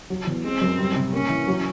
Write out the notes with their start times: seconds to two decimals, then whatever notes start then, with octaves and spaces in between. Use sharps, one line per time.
0.10 F#3
0.27 E2
0.44 G#3 C4
0.61 F#2
0.79 G3
0.96 C3
1.13 A#3 C#4
1.30 E3
1.48 F#3